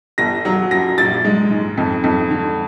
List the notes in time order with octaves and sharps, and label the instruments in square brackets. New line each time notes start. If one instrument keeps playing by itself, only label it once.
[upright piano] G1 A#6
F#3
F#2 A#6
A#1 A6
G#3
G#2
F2
F2
D3